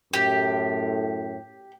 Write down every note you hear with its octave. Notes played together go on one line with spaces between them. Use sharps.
F#2 A2 G4